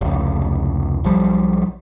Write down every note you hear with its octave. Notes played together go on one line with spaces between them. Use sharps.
F1 C#2
B1 F3 G3